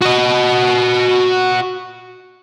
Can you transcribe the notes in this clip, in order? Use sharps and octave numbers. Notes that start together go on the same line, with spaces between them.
F#4 D#5